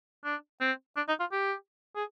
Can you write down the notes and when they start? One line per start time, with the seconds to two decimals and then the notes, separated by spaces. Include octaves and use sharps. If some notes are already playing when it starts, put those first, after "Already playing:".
0.25 D4
0.61 C4
0.97 D4
1.08 D#4
1.20 F4
1.32 G4
1.96 G#4